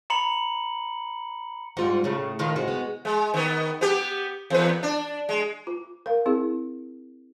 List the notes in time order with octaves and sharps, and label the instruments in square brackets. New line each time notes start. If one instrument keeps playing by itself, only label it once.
[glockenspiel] A#5 B5 C#7 F#7
[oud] G#2 [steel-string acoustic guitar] G3 F4 F#5
[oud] A2 C#3 [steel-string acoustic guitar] A3
[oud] A2 D#3 F4
[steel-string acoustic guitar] C3 [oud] G#3 F#4
[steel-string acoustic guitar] B3
[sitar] G#3
D#3 B3
B3 G4
E2 B4
D4
G#3
[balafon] F4
A#4 F5
C4 E4 G#4